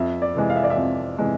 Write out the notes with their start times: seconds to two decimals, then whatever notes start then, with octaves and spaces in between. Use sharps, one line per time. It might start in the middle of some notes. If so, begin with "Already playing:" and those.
Already playing: F2 E5
0.22 D5
0.35 C3 E3 G#3
0.50 F5
0.56 E5
0.63 D5
0.70 E5
0.76 F2
1.18 C3 E3 G#3